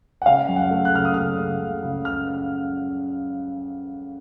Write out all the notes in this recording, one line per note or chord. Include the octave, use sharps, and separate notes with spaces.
F#5
C#3 F5
F#2
F#5
A3
F#6
C#3 F6
D#6
C#3 F6
C#3
F#2
C#3
F6